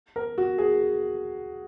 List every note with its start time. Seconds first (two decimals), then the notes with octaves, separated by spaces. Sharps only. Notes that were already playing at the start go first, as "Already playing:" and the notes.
0.16 A#4
0.38 F#4
0.58 G#4